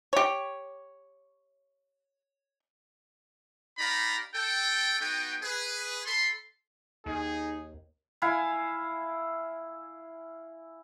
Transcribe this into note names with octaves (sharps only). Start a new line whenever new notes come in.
G4 C#5
D#4 G4 D5 F5 A#5 B5
A4 G5
B3 D#4 F#4 G5
G#4 B4
A4 B5 C6
D#2 D#4 G#4
E4 F5 G#5